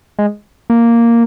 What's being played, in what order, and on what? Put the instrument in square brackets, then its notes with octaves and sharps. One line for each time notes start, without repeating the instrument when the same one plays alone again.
[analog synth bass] G#3
A#3